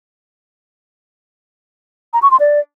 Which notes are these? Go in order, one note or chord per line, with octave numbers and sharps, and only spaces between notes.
A#5
C#6
C6
D5